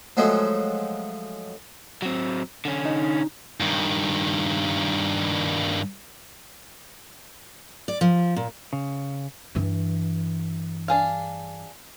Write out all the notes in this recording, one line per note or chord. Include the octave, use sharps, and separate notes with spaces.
F3 F#3 G#3 A3
F#3 C4
D3 C#4
D#4
G2 D#3
D5
F3
A#2
C#3
G2 E3
D4 G#4 F5